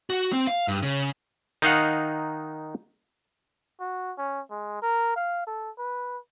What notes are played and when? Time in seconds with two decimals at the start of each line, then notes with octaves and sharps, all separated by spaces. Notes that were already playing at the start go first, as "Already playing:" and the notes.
0.10 F#4
0.33 C4
0.47 F5
0.68 G2
0.83 C#3
1.62 D#3 D#4 F5 F#5
3.80 F#4
4.18 C#4
4.51 G#3
4.82 A#4
5.16 F5
5.47 A4
5.78 B4